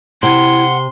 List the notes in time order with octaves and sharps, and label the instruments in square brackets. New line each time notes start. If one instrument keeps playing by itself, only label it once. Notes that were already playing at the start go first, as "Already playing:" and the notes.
[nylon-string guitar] C3 [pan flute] E4 [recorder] F#5 [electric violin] C6